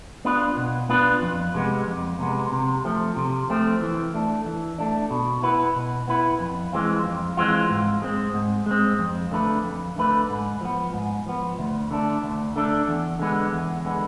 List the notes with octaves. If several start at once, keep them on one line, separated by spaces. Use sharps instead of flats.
B3 D4 F4 B4
B2
B3 D4 F4 B4
F2
C3 G#3 B3
F2
C3 G#3 B3
C3
F3 A3 C4
C3
F3 A3 C4
E3
A3 D4
E3
A3 D4
B2
B3 E4 B4
B2
B3 E4 B4
F2
E3 G#3 C4 F4
F2
E3 G#3 C4 F4
G#2
G#3 C4
G#2
G#3 C4
F2
D3 A3 E4 B4
F2
D3 A3 E4 B4
G#2
F3 B3
G#2
F3 B3
D2
D3 A3 D4
D2
D3 A3 D4
E2
D3 G#3 B3
E2
D3 G#3 B3